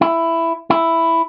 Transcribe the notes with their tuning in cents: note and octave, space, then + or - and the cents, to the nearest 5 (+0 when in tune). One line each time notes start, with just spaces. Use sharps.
E4 +10
E4 +5